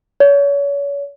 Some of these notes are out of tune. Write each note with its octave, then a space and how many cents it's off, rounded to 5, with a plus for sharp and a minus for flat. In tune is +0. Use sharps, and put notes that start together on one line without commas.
C#5 +35